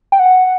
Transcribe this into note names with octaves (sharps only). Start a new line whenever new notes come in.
G5
F#5